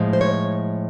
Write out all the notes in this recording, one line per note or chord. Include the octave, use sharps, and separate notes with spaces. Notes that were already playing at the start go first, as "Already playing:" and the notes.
Already playing: A2 F3 G#3
C5
C#5